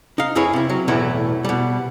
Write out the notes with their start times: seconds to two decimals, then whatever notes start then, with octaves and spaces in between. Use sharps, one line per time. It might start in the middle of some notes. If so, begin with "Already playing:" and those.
0.18 D#4 F5
0.35 F2 E4 G#4 B4 C#5
0.53 C3 E4
0.70 F#3
0.88 B1 E2 A2 E3 A3 E4
1.45 B2 G3